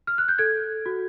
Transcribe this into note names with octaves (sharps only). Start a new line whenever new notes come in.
F6
F#6
G6
A4 G#6
F#4